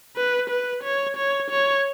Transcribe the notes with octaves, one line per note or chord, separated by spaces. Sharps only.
B4
B4
C#5
C#5
C#5